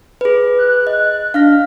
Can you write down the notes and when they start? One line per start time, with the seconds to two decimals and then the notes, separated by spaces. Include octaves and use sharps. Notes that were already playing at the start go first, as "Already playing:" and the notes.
0.21 G#4 B4
0.59 F#6
0.87 D#5
1.34 D4 F5 F6 A#6